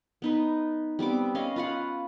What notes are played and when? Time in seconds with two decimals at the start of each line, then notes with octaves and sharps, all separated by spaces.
0.22 B3 D#4 B4
0.99 G3 B3 C4 D6
1.35 C#4 D#5 F5
1.56 F4 B4 F5 F#5